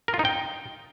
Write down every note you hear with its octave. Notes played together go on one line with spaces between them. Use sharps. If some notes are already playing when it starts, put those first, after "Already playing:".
A#4
F4
D#4
G5